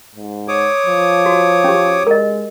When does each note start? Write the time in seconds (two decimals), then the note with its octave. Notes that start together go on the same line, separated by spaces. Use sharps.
0.15 G#2
0.48 C#5 D6 D#6
0.86 F3
1.26 F#4
1.64 C#4 G4
2.07 G#3 A#4 D#5